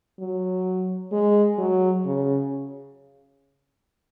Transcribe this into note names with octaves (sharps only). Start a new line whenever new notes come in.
F#3
G#3
F#3
C#3